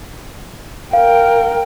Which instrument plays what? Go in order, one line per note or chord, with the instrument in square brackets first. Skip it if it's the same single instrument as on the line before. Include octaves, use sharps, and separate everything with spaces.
[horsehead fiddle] A#4 G5 [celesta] F5